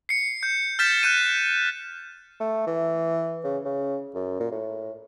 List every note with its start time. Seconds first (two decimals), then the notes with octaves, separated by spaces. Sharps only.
0.09 C7 C#7
0.43 G6
0.79 F6 G6 A6 B6 E7
1.03 F#6 G6 D#7
2.40 A3
2.67 E3
3.44 C#3
3.65 C#3
4.15 F#2
4.40 A#2
4.52 A2